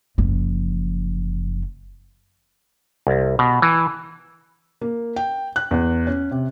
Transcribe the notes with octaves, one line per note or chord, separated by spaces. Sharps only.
F#1 F3
C2
B2
E3
A#3
G5
F#6
E2
C#4
C3